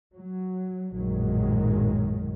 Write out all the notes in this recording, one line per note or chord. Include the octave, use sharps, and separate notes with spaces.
F#3
A#1 F#2 A2 D#3 F#3 G#3